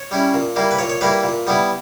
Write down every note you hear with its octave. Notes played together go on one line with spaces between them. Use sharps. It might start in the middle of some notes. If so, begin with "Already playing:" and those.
Already playing: C#5
G3 C#4 E4
A#2
G3 A#3 E4
B4
A#2 C#5
C#5
G3 A#3 E4 B4
A#2
G3 B3 E4